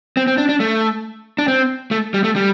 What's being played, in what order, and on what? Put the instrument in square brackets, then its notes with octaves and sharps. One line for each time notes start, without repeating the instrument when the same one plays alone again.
[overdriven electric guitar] C4
C4
D4
D4
A3
D4
C4
A3
G3
A3
G3